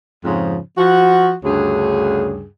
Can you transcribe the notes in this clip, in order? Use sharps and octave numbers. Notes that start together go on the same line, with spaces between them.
F2 G#2 C#3 F3
F3 F#4
D2 G2 C#3 G#4